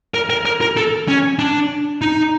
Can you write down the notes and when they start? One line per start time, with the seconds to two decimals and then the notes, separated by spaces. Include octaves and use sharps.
0.14 A#4
0.30 A#4
0.45 A#4
0.61 A#4
0.77 A4
1.08 C#4
1.39 D4
2.02 D#4